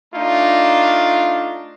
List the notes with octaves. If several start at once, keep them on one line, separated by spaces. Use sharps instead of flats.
A3 D4 D#4 F4